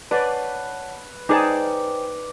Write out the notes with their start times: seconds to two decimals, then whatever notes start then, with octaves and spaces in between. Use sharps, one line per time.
0.11 B4 C#5 D5 F#5 A5
1.29 D#4 G#4 B4 C5 D5 G5 A5